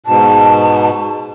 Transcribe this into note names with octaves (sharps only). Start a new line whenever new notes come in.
G#2 B2 A5